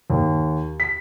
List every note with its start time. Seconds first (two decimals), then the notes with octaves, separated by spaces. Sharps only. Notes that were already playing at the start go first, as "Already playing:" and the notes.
0.10 D#2
0.80 B6